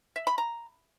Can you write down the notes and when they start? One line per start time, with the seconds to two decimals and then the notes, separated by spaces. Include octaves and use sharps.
0.16 E5
0.27 B5
0.38 A#5